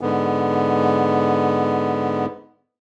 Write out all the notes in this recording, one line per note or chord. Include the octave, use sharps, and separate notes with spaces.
G#2 D3 B3